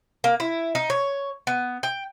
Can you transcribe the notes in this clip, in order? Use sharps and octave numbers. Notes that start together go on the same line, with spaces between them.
A#3
E4
D#4
C#5
B3
G5